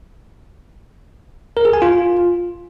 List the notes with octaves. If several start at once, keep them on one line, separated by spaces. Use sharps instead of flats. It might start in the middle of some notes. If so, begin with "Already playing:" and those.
A#4
G#4
G#5
F4